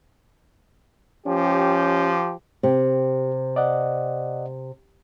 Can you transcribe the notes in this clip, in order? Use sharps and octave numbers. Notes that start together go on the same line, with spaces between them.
F3 C#4 G4
C3 G4
D5 D#5 F#5